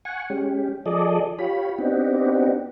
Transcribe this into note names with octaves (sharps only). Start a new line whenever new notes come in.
F#5 G#5 C#6
G#3 C#4 G4
F3 G#4 A4 D5 D#5
F4 G4 C#5 B5
B3 C4 D4 D#4 F#4 G4